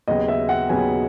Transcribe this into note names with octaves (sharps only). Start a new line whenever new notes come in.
D#2 C#3 F#3 B3 D#5
E5
F#5
D#2 C#3 F#3 B3 G#5